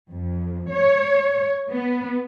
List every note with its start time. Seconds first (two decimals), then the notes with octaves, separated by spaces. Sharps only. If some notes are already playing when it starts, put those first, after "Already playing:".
0.11 F2
0.71 C#5
1.71 B3